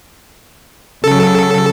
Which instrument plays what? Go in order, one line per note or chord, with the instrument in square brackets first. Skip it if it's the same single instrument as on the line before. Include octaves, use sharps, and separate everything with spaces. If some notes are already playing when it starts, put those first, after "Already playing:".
[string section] C#3 F#3 [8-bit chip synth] A4